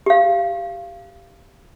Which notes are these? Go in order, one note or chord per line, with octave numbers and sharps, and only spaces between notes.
G4 F5